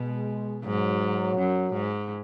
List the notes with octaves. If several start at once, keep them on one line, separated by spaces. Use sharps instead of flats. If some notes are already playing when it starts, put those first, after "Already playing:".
Already playing: B2 G#3
G#2 F#3
F#2
G#2